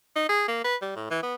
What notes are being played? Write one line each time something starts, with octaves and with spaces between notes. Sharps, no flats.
D#4
G#4
A#3
B4
G3
A2
E3
B3